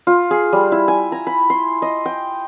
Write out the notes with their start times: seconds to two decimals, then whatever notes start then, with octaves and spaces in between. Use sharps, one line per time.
0.07 F4
0.31 G#4
0.53 G3
0.72 E4
0.88 G#5
1.12 A#5
1.27 B5
1.50 C6
1.82 D#5
2.06 G5